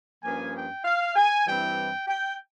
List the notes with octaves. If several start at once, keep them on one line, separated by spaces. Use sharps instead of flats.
G2 F3 A#3 C#4 G#5
G5
F5
G#5
G2 E3 G3 C4 E4 G5
G5